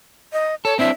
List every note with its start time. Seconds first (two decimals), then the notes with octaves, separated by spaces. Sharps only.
0.33 D#5
0.65 A4 C#5
0.79 C4 D4 E4 E5